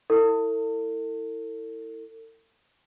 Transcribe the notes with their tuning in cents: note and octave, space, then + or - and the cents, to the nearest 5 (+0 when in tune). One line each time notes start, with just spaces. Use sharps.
E4 -10 A4 +40